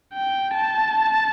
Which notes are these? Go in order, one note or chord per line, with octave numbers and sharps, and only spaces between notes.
G5
A5